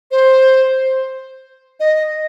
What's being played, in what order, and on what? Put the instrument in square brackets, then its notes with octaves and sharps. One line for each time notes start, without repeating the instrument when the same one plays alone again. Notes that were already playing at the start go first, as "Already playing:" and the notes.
[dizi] C5
D#5